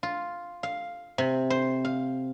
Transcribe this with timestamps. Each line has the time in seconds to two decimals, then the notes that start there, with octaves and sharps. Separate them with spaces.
0.03 F4
0.63 F5
1.18 C3
1.50 C5
1.85 F5